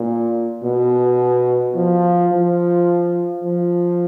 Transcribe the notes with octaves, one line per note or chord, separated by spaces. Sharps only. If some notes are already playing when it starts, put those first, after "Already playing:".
Already playing: A#2
B2
F3
F3
F3